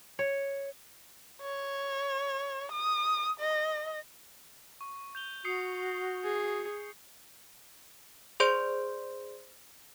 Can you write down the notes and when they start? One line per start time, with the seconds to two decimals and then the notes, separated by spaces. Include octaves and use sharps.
0.19 C#5
1.42 C#5
2.72 D#6
3.40 D#5
4.81 C#6
5.15 G6 F7 G7
5.45 F#4 D#6 C7 C#7
6.24 G#4
8.40 G#4 C5 D5 C6 G6 D7